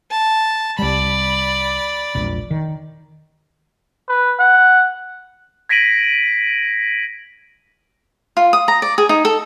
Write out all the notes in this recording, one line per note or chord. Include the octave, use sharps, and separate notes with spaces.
A5
C2 G3 D5 B5
E1 A#1
D#3
B4
F#5
G#6 A#6 B6 D7 D#7 F#7
F4
D#6
A#5
D5
G#4
D#4
A4